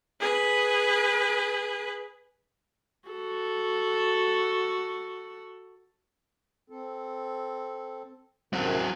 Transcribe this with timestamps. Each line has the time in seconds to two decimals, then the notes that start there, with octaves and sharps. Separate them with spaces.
0.20 G#4 B4
3.09 F#4 A4
6.70 C4 A4
8.53 F#2 C3 D#3 F#3 C4